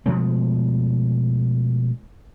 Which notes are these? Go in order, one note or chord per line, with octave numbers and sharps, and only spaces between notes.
B2 F3 G#3 A3